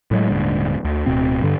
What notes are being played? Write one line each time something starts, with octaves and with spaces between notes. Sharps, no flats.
A2 F#3 G#3
D#1 G#2 D3
D2
D1 B2 C4
G2 D3